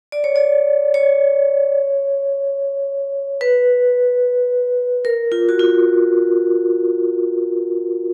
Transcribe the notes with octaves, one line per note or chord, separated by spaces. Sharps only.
D5
C#5
D5
C#5
B4
A#4
F4
F#4
F4